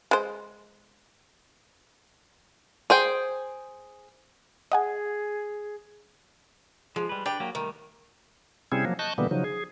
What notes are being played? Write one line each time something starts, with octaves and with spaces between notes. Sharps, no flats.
G#3 C5
G#4 C5 G5
G#4 D#5 F#5 G#5
F3 G#3
G3 B4
D4 G4 B4 G5
F#3 A#3 G4
D#3 G3 A3
C3 G3 C4 C#4 E4 G#4
F3 F#3 A#3
D#5 A5 C#6 F#6 G6
B2 D3 E3 G3 A#3 B3
C#3 F3 F#3 D#4
G#4